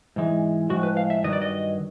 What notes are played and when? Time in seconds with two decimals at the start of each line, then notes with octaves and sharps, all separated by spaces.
0.16 G#2 E3 G#3
0.70 A2 F3 G#3 F#4
0.83 B4
0.97 F5
1.10 E5
1.24 G2 D#3 F#3 D#5
1.33 D5
1.42 D#5